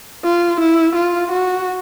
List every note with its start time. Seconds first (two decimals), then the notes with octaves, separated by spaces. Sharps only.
0.25 F4
0.60 E4
0.96 F4
1.32 F#4